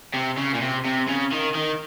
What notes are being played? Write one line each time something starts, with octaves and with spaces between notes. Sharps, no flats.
C3
C#3
A#2
C3
C3
C#3
D#3
D#3